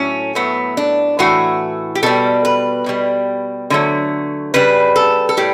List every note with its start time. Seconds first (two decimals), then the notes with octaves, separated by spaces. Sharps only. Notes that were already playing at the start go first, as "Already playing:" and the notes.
Already playing: A2 F#3 A3 C#4
0.35 A2 F#3 A3 B3
0.77 D4
1.19 A2 E3 A3 F#4
1.95 G4
2.03 B2 G3 A4
2.45 B4
2.86 B2 G3
3.70 D3 F#3 A3
4.54 C#3 G3 B4
4.96 A4
5.29 A4
5.37 A2 G3 G4